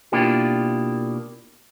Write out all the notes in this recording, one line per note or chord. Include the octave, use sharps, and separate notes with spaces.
B2 A#3 D4 E4 F4 G4